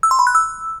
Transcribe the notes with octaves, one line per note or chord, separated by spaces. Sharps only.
E6
C6
B5
F#6
E6